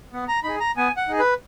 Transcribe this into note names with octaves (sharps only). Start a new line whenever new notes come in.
B3
A#5
D#4 G#4 B5
A#5
B3 G#5
F#5
D#4 G#4
B4